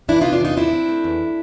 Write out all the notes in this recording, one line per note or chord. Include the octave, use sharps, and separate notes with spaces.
E3 D4 E4
C3 D#4 F4
D4
E2 D#4 F4
C4 D4 E4
C4
A3
E2